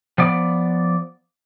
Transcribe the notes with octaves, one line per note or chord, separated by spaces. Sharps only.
F3 B3 D5